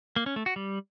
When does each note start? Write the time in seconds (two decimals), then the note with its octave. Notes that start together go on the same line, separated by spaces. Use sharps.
0.16 A#3
0.26 C#4
0.36 A3
0.46 F#4
0.56 G3